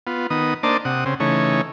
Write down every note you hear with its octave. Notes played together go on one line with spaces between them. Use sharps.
B3 F4
D#3 B3 D#6
A#3 D4 C5 D5 D#5 A5
C3 F#5 D#6
C#3 C4
C#3 E3 A3 D#4 C#5